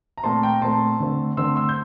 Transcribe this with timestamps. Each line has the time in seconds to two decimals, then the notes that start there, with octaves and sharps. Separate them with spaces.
0.18 A#5
0.23 A#2 A3 C4 A5 C6
0.43 G5 A#5
0.61 A#2 A3 C4 A5 C6
1.00 D3 A3 C4
1.37 D3 A3 C4 C6 E6
1.56 C6 E6
1.69 G6